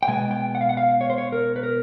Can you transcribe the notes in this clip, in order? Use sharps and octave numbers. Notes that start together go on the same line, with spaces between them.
G5
B2 G#3 B3 G#5
G5
F#5
F5
F#5
F5
C#5
C5
C#5
A#4
B4
A#4